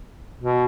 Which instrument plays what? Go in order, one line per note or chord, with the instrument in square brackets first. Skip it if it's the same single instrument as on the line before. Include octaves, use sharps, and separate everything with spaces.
[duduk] B2